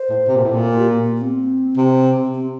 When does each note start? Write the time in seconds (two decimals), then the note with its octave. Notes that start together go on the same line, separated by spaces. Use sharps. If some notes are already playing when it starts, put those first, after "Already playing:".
Already playing: C5
0.10 A2
0.28 C3
0.36 A#2
0.44 A2
0.52 A#2
0.71 F4
0.77 G4
0.90 A#3
1.03 A#3
1.16 A#3
1.21 C4
1.77 C3
2.14 C4
2.33 C4